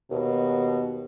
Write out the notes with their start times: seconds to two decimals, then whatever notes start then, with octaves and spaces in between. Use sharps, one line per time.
0.11 D#2 B2